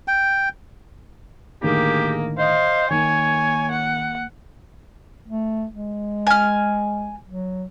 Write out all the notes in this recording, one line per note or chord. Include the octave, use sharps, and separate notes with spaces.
G5
A2 D3 D#3 A#3 G4 G#4
C5 D#5 F5
D#3 A#3 C#5 G#5
F#5
A3
G#3
G#5 F6
F#3